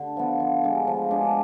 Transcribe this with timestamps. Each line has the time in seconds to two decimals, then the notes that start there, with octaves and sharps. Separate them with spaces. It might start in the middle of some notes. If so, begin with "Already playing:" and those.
Already playing: D3
0.17 F3 B3
0.40 F3
0.63 G#3 D4
0.87 F3
1.11 G#3 D4